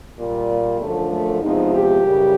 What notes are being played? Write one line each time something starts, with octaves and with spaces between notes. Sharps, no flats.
A#2 G3
A#3
F#2 D3 F3 A3
A3
E2 C3 F3 G#3 D#4
G4
F#2 C#3 E3 G3